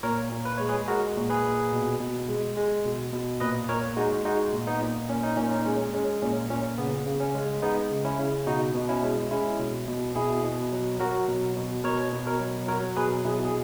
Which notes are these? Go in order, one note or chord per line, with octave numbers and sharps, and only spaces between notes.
A#2 A#4 C#5
A#2
B4
G#3 C#5
G#4 B4
G#3 F#4 A#4
A#2
G#4 B4
A#2
B2
B2
G#3
G#3
B2
B2
A#2 B4 D#5
A#2 A#4 C#5
G#3 D#4 F#4
G#3 D#4 F#4
A#2
B3 D#4
A#2
A#2 C#4
D#4
A#2 C#4
D#4
G#3 C#4
G#3 C#4
A#2 C#4
A#2 C#4
C#3 B3
B3
C#3
C#4
G#3
G#3 B3 D#4
C#3
C#4 E4
C#3
B2 D#4 F#4
B2
C#4 E4
G#3
G#3 C#4 E4
B2
B2
B2 E4 G#4
B2
F#3
F#3 F#4 A#4
B2
B2
B2 A#4 C#5
B2
A#4 C#5
F#3
F#3 A#4 C#5
B2 G#4 B4
B2 E4 G#4
G#4